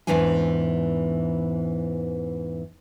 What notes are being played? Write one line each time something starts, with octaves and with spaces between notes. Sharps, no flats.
E2 G#2 E3 C#4 D4 G#5